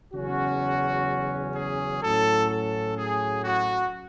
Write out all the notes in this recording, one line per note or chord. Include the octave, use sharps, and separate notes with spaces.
E2 C#3 F#3 C#4 F#4
G#4
A2 F#3 C#4 A4
A4
G#4
F#4